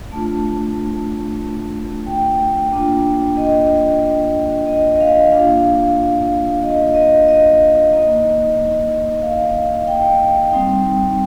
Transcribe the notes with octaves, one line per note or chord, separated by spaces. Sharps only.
A3 D4 F4 A5
G5
A#3 D4 F4
D#5
D#5
D#5
F5
A#3 D4 F4 F5
D#5
D#5
D#5
A#3 D#4
F5
G5
G3 C4 D#4